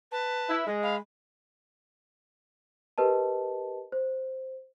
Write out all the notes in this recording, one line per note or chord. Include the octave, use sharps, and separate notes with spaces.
B4 A5
E4
G#3 D#5
F5 B5
G4 A#4 B4 D#5 A5
C5